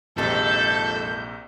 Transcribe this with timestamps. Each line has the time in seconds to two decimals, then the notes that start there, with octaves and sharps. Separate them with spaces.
0.18 A#1 F2 G#2 C3 D#3 A4 G6